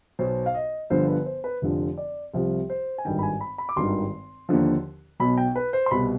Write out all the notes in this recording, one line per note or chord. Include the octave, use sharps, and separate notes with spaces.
B1 B2 C5
F5
D#5
G1 G2 D3 F3 C5
B4
C5
B4
F1 F2 D3 F3
D5
C2 C3 F3
C5
G#5
G#1 G2 D#3 G5
B5
G#5
B5
B5
D6
G#1 G2 D#3 C6
D#2 D3 F3
B1 B2 B5
G5
B4
C5
C6
C2 B2 B5